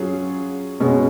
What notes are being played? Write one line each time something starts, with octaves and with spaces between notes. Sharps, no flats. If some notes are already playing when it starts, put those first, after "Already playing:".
Already playing: F#3 C#4 F4 G#4
B2 G#3 C#4